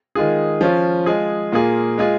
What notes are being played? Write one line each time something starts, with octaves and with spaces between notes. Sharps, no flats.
D#3 G#3 F4 G#4
F3 C#4 F4
G#3 F4 G#4
A#2 A#3 F4 G#4
G#3 F4 G#4